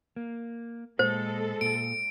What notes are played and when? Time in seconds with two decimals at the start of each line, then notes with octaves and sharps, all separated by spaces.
0.16 A#3
0.99 A#2 G#3 A4 C5
1.61 A#2 D7